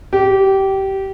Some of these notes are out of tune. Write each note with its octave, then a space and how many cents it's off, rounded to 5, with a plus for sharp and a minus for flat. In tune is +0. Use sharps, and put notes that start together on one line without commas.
G4 -20